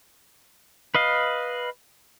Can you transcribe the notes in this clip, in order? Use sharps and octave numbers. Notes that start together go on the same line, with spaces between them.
B4 D#5 F5